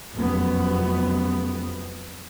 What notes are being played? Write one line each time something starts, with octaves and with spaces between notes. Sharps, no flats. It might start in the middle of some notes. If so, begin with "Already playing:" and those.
F1 F#2 B3